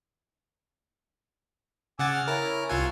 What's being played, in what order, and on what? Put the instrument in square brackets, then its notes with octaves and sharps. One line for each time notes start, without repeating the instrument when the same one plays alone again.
[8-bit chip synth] C#3 F#5 A6 [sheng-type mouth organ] G#5 D6 E6
[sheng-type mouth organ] F6
[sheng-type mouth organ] C#4 E4 [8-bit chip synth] A#4
[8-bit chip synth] C2 F4 G#5 [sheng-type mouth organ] C#6 E6 F#6